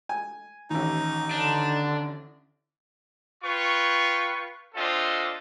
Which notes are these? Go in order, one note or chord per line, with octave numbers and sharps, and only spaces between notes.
G#5
A1 D#2 D#4
D3 D4
F4 B4 G5 C#6
C4 D4 F4 A4 D#5